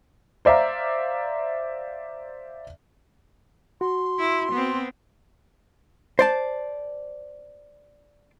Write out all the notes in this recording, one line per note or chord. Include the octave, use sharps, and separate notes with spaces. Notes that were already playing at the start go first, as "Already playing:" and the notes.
C5 D5 E5 F5 A#5
F#4 C6
E4
B3 C4
C5 D5 A5